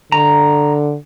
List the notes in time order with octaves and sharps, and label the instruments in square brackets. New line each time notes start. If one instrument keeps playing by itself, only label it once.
[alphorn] D3 [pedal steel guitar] A#5